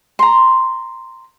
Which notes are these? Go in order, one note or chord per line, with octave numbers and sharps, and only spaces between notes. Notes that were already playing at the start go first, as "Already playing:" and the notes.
A#5 C6